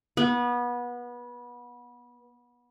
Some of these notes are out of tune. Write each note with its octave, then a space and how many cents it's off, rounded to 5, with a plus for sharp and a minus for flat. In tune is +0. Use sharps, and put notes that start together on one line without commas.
B3 -25